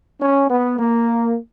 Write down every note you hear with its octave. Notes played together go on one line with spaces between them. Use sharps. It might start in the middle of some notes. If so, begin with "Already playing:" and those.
C#4
B3
A#3